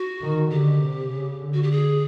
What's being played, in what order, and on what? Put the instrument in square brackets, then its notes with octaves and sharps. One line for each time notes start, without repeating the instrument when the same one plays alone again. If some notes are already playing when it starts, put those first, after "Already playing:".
Already playing: [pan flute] F#4
[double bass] D#3
[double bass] D3 [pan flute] G4
[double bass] C3
C#3
D3
[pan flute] F#4
G4
G#4